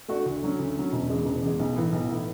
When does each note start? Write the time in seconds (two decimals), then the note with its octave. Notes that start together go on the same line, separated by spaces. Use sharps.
0.08 A3 D4 F#4
0.26 D2
0.42 D3 F#3 C#4
0.59 D2
0.76 D3 F#3 C#4
0.93 E1
1.09 E2 C#3 G#3
1.25 E1
1.42 E2 C#3 G#3
1.59 B1
1.76 A2 E3
1.92 B1
2.09 A2 E3